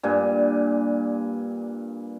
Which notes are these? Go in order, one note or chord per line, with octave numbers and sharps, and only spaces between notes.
G2 A#2 G#5